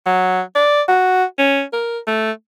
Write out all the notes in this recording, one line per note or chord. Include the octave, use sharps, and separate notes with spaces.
F#3
D5
F#4
C#4
A#4
A3